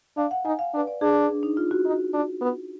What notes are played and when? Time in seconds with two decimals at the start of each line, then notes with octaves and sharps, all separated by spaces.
0.17 D4 F5
0.31 F#5
0.45 D#4 G#5
0.59 F5
0.74 D4 B4
0.87 D5
1.01 D4 G#4
1.29 D4
1.43 D#4
1.57 F4
1.71 F#4
1.85 D#4
2.13 D4
2.41 B3